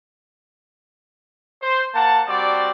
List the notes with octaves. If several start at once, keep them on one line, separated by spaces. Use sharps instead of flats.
C5
A#3 F#5 A5
G3 C4 F#4 D5